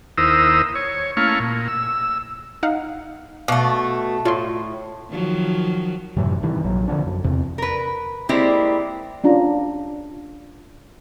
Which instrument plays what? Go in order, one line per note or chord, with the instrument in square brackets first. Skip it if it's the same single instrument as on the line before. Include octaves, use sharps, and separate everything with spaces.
[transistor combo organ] D#2 E4 A#4 C5 D#6 E6
C#5
A3 A#3 C#4 E4 F5 C#6
A#2
E6
[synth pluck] D#4 F5 F#5
[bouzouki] B2 A3 [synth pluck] F5 D6
[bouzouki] A2 [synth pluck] F4 E5 C6
[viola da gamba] D#3 F3 F#3
[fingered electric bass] F#2 A2 C3 E3
G2 C3 D#3 E3
A#1 F#3
D3 F3 B3 D4
F#2
E2 C3
[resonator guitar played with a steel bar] A#4 B4
G3 G#3 A#3 C4 E4 G4
[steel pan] C#4 D4 F4 A#5